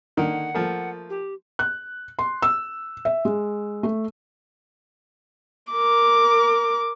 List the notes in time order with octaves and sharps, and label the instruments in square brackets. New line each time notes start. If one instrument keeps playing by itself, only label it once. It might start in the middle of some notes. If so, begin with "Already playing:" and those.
[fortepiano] D3 D#3 A#3 [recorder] F#5
[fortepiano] F3 A3 A#3
[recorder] G4
[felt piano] F#6
C6
E6
E5
G#3
A3
[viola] A#4 D6